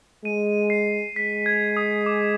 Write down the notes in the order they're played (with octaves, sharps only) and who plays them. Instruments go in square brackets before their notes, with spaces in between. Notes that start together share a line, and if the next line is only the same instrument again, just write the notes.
[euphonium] G#3 [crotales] D#7
[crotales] C7
[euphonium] G#3 [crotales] B6
[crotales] G#6
D#6
D6